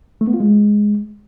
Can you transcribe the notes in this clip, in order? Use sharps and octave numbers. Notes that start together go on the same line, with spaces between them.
A3
B3
F4
G#3